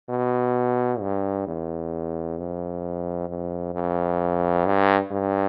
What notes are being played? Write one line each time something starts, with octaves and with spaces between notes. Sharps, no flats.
B2
G2
E2
F2
F2
F2
G2
G2